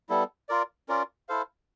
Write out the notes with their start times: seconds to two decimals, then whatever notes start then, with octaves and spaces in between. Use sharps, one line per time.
0.09 G3 B3 E4 A4
0.49 F4 A#4 D5
0.89 C#4 F4 A#4 D5
1.29 E4 A4 C5 F5